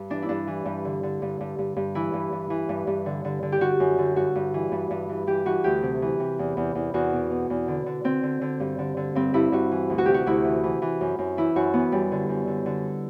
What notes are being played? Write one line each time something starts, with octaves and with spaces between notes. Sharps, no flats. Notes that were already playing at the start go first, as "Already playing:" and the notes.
Already playing: G2
E3 D4
E4
G2 D4
E3
G2
D3
D3
G2
G2
G2
G2
E3 E4
G2
G2
E3
G2
G2
D3
D3
D3
G4
D3 F#4
F#2
D3
G2 F#4
G2
E3
G2
G2
E3
E3 G4
E3 F#4
D2 G4
C3
E3
C3
E2
E2
E2
E2 F#4
B2
B2
E2
D3
D3
D3 C4
D3
D3
G2
D3
D3
G2 C4
G2 E4
G2 F#4
E3
D2
F#4
C3 G4
F#4
D2 E4
E3
E3
E3
F#2
F#2
E3 E4
F#2 F#4
E3 B3
F#2 G3
D3
F#2
D3
D3